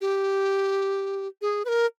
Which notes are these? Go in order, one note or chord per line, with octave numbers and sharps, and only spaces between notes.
G4
G#4
B4
A#4